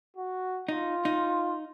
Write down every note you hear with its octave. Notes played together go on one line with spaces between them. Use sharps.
F#4
D#4 F4
D#4